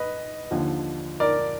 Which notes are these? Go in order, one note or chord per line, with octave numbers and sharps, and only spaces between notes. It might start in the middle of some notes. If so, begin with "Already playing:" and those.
Already playing: B4 D#5
D#2 D3 F3
A#4 D5